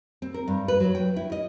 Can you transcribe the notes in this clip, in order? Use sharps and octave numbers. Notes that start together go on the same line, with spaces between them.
C4
A#4
G2
B4
F#3
G5
E4
D#5